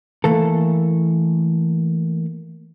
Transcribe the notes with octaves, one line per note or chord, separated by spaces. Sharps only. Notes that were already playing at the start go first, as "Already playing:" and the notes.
E3 A3 A#3 A4